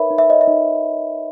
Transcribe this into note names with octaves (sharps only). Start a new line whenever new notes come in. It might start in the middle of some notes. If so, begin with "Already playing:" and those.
Already playing: D#4 A#4 B4 C#5 E5 B5
D#4
E5
C#5 D#5
E5
D#4